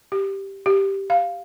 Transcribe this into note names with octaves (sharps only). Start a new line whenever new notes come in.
G4
G4
F5